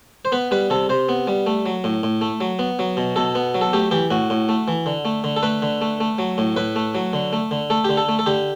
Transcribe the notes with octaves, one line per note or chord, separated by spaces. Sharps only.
C5
B3 B4
G3 B4
C3 A4
C3 C5
B3
G3
A3
F#3
A2
A2
A3
F#3
B3
F#3
B2
B2 A4
B3
F#3
A4
A3 G4
E3 G4
A2 F#4
A2
A3
E3
D3
A3
D3
A4
A3 B4
D3
A3
A3
F#3
A2
A2 B4
A3
F#3
D3
A3
D3
A3 A4
D3 G4
A4
A3
A4
D3 G4